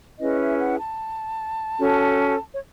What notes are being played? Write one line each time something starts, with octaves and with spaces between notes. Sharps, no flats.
C#4 E4 G#4 B4 D#5
E5
F#5
A5
C#4 F#4 A4
C#5